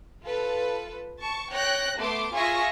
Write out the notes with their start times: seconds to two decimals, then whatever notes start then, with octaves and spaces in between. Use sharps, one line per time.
0.24 F4 A4 B4
1.20 A5 C#6
1.52 C#5 G5 F#6 A#6
1.98 A3 B3 C6 D6
2.34 F4 G#4 E5 G#5 C#6 A#6